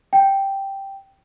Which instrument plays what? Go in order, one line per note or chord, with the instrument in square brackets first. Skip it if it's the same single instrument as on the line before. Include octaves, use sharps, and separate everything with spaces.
[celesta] G5